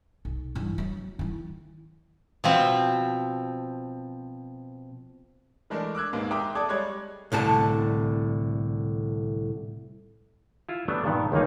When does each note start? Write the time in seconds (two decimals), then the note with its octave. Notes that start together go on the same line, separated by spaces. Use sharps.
0.25 B1
0.55 G2 E3
0.78 F#3 B3
1.19 D#3 E4
2.44 B2 F3 C4
5.70 E3 G#3 A3 D4 A#4
5.95 D6 E6 F#6 G#6
6.13 D#2 G#2 G#3 A#3 B3
6.31 E5 G5 A#5 C6 D6 D#6
6.55 A4 D5 A5 D6 D#6 G#6
6.68 G3 G#3 C#5 D5 F#6 G#6
7.32 C2 A2 D3 A5
10.69 E4 F4
10.88 F#3 G3 A3 B3 D4
11.05 G2 A#2 D#3 B3
11.32 C#2 D#3 G3 A#3 D#4